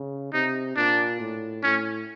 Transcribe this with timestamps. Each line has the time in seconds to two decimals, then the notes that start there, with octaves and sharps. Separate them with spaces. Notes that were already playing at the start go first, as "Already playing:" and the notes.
Already playing: C#3
0.33 C3 D#4
0.76 A#2 D4
1.20 A2
1.63 A2 C#4